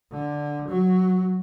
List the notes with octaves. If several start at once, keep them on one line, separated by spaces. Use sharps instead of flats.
D3
F#3